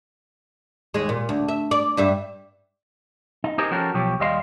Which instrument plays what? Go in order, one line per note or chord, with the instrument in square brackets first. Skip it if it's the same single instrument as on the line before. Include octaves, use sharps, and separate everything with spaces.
[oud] D#2 G#3
A#2
D2
E5
D5
G2 G3 E5
[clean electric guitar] D#4
D#4 G4 G#4 A#4 C5 D#5
F3 C#4 F#4 G4 A4 A#4
B1 F3 G4 C#5
D#2 G3 D#5 F5 C6